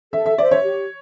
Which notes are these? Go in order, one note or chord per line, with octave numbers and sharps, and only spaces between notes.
A4 E5
E5
C5 D5 E5
C#5
G4